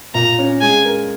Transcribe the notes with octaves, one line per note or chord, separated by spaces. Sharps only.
A#2 A#5
C#4
G#3 G#5
A#4